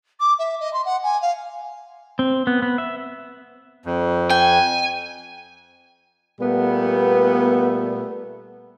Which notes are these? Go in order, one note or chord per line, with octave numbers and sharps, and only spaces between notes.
D6
E5
D#5
C6
F#5
G#5
F5
C4
B3
B3
E5
F2
G5 G#5
A#2 G3 A3 B3